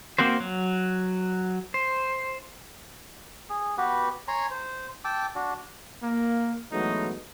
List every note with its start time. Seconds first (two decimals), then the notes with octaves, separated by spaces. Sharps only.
0.18 A#3 C4 F#4 C5
0.40 F#3
1.74 C5
3.50 G#4
3.78 B3 F#4 G4 B4
4.28 C#5 G#5 A#5 C6
4.51 C5
5.04 G5 A5 D6 E6
5.35 D4 F#4
6.03 A#3
6.72 E3 F#3 G#3 A3 B3 D#4